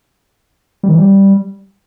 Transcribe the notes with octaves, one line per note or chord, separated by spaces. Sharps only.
G3
D#3
E3
G3